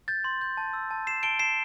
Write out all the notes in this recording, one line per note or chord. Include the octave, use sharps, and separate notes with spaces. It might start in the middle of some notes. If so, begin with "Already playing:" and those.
G6 A6
C6
G6
A5
E6
A5
A5 C7 E7
A5 D7 G7
A5 C7 E7